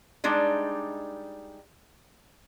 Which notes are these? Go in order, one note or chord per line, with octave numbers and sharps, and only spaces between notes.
G3 G#3 D4 D#4